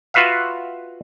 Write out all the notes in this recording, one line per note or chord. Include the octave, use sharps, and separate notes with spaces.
F4 F#4 B4 E5 F5